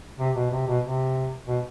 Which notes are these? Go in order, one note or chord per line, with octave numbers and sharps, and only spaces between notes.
C3
B2
C3
B2
C3
B2